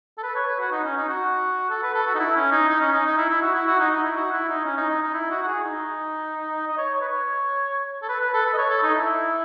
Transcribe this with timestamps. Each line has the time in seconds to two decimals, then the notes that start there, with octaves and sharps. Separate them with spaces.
0.18 A4
0.23 B4
0.35 C#5
0.47 B4
0.60 F#4
0.71 D#4
0.84 C#4
0.97 D#4
1.09 F#4
1.70 A4
1.83 B4
1.95 A4
2.07 F#4
2.15 D#4
2.19 E4
2.36 C#4
2.51 D#4
2.68 D#4
2.81 C#4
2.92 D#4
3.05 D#4
3.17 E4
3.29 E4
3.42 F#4
3.54 E4
3.67 F#4
3.79 D#4
3.91 D#4
4.04 E4
4.16 F#4
4.32 E4
4.49 D#4
4.65 C#4
4.77 D#4
4.90 D#4
5.02 D#4
5.14 E4
5.31 F#4
5.43 F#4
5.47 G#4
5.63 D#4
6.68 D#5
6.78 C#5
6.95 C#5
7.01 B4
7.08 C#5
8.02 A4
8.09 B4
8.21 B4
8.33 A4
8.46 B4
8.53 D#5
8.58 C#5
8.70 A4
8.83 D#4
8.95 E4